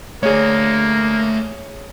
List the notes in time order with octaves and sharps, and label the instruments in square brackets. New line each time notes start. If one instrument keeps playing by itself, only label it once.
[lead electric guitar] A3 D5 [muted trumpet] A#3 [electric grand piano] G#4 C#5